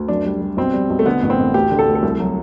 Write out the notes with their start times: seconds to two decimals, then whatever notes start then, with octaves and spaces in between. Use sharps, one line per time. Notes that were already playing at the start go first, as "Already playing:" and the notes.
Already playing: D2
0.08 F#2 D4
0.25 G3
0.41 G3
0.57 B1 C4
0.74 G3
0.90 B1
0.99 A3
1.06 D3 B3
1.23 A1
1.30 C4
1.39 A1
1.54 D2 G4
1.71 D3
1.79 A4
1.88 D2
1.95 A4
2.03 C2
2.19 F#3